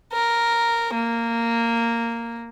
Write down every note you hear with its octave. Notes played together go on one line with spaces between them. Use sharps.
A#4
A#3